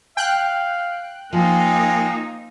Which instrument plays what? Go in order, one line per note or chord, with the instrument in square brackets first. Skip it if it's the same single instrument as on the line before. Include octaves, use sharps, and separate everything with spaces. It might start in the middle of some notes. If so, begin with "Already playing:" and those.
[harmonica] F5 [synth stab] G5 F#6
[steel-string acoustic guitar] F3 [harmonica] G#3 C4 [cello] A#3 D#4